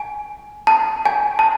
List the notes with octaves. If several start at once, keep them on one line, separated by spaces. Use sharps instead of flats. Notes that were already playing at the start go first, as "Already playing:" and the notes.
Already playing: G#5
A5
G#5
A5